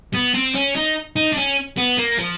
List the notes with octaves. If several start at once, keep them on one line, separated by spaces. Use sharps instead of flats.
B3
C4
C#4
D#4
D#4
D4
C#4
B3
A#3
F3